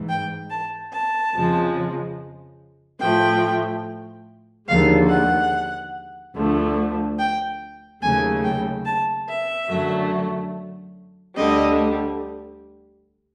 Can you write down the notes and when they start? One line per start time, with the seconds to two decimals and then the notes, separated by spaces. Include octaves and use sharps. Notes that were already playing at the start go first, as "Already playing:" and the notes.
Already playing: G#2 E3
0.09 G5
0.50 A5
0.92 A5
1.34 F2 C#3 F3 G#3
3.00 A2 F3 A3 G5
4.68 D#2 D3 F3 G#3 F5
5.09 F#5
6.35 D2 D3 F3 A3
7.19 G5
8.02 D#2 C#3 F#3 A3 G#5
8.43 G5
8.85 A5
9.28 E5
9.69 F#2 D3 F#3 A3
11.36 D2 D3 G3 D#5